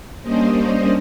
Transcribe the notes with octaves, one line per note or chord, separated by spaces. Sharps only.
G3 A#3 C#4 D4 C5 D#5